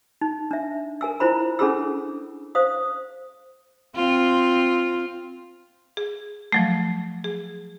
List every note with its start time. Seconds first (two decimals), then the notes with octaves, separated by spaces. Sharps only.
0.21 D#4
0.51 D4 E5
1.01 A#4 G#5 E6
1.20 E4 F4 C5 B5
1.59 C#4 D4 G#4 A4 B5 E6
2.55 C5 F5 D#6
3.95 C4 F4
5.97 G#4
6.52 F3 F#3 A3
7.24 G#4